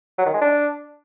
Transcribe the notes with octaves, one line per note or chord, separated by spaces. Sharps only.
F#3
D#3
G#3
D4